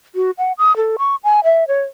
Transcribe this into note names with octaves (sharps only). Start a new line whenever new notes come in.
F#4
F#5
D#6
A4
C#6
G#5
E5
C#5